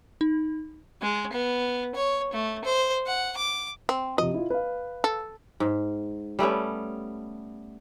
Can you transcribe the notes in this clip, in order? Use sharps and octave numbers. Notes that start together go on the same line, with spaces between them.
D#4
G#3
B3
C#5
A3
C5
F#5
D6
C4
C3 F3 D#5
E4 F4
B4 F5
A4
G#2
G3 A3 B3 C#4